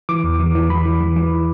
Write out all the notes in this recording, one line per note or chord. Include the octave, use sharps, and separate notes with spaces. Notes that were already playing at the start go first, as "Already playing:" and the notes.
E3 D6
E2
E3
E3
E3 B5
E3
E3
E3